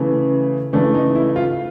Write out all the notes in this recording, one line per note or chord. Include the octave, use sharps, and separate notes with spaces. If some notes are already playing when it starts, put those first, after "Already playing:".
Already playing: C#3 E3 A3
C#3 E3 A3 D4
D#4
E4
F4